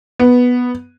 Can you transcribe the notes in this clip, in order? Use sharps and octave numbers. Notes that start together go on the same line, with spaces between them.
B3